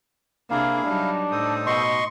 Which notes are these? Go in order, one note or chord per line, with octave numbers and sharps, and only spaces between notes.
C3 A#3 D4 E4 G#4 F5
F#3 G3 D4 D#4
A2 D#4 A4 C5 D#6
B2 D#5 C6 C#6